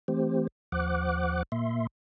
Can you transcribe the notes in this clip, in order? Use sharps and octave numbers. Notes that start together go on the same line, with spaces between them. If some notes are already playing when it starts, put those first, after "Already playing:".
E3 A3 C4 G4 C5
D#2 F3 C5 F#5 D6 F#6
A#2 A#3 E5 C6